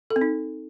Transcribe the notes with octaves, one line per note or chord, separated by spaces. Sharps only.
A4
C4
D#4